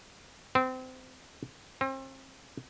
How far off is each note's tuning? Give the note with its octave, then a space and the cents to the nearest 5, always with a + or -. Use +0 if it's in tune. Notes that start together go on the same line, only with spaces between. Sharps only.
C4 -25
C4 +35